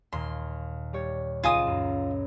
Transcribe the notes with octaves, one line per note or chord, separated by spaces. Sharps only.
D#2 A#2 C6
G3 G4 C#5
C#2 D#4 F4 G#5 D#6 E7
F#2